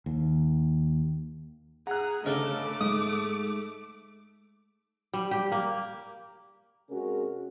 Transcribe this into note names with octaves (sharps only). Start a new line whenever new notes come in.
D#2
G#4 F#5 A#5 F#6
G1 C#3 A3 A4 A#4 D#5 D6
G#2 G#3 D#6
G3
G4
A#3
C3 G#3 C#4 F#4 G#4 A#4